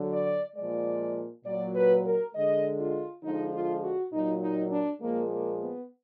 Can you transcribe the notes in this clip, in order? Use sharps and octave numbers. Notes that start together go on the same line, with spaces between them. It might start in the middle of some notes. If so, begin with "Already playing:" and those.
Already playing: D3 F#3
D5
A#2 F3 G#3 D5
A#2 F#3 D5
B4
A#4
D3 G#3 D#5
F4
D3 F3 G#3 D#4
F4
F#4
A#2 F#3 D#4
D#4
D4
A#2 F3 G#3 A#3
A#3
B3